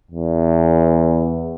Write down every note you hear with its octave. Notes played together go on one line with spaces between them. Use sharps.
E2